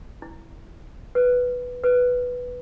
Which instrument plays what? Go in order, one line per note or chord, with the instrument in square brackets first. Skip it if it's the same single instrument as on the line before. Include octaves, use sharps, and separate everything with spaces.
[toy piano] E4
B4
B4